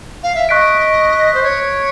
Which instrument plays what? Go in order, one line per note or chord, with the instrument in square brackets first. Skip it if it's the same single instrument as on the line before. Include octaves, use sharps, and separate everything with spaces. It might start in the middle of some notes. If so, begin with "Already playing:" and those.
[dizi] F5
E5
[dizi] D#5 [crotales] C#6 F#6 B6 D7
[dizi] C5
C#5